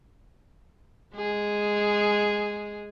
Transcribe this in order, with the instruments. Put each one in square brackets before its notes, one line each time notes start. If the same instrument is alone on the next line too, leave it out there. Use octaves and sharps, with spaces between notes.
[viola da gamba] G#3 G#4